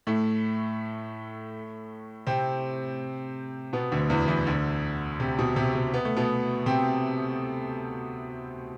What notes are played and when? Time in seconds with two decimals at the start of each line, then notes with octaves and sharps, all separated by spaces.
0.07 A2 A3
2.27 C3 C4
3.73 B2 B3
3.92 D2 D3
4.10 E2 E3
4.28 E2 E3
4.47 D2 D3
5.20 C3
5.39 B2
5.56 C3
5.75 C3
5.94 B3
6.05 A3
6.16 B2 B3
6.66 C3 C4